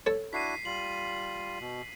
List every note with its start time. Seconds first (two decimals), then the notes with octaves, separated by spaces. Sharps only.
0.06 A4 C#5
0.33 D4 E4 F#4 B6 C7 D#7
0.65 G3 F4 F#7
1.61 B2